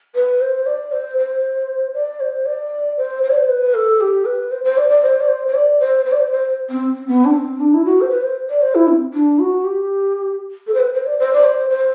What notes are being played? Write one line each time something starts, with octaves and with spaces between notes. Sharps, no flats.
B4
C5
D5
C5
C5
D5
C5
D5
C5
C5
D5
C5
B4
A4
G4
B4
C5
C5
D5
D5
C5
D5
C5
C5
D5
C5
C5
D5
C5
C5
C4
C4
B3
D4
C4
D4
E4
F#4
C5
B4
C5
D5
C5
E4
C4
D4
F#4
G4
A4
C5
B4
C5
D5
C5
D5
C5
C5